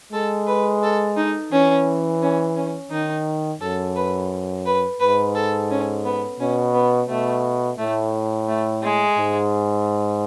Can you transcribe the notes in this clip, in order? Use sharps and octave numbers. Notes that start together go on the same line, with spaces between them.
G#3 A4
B4
A4
D#4
E3 C#4
C#4
C#4
D#3 D#4
F#2 A4
B4
B4
G#2 B4
A4
C#4
B3
B2 C#4
B3
B2 A3
A2 A3
A3
G#3
G#2